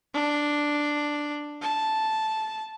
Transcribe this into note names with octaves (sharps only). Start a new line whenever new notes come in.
D4
A5